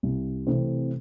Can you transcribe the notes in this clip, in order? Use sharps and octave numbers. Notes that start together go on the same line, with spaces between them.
C2
C3 E3 A3 C4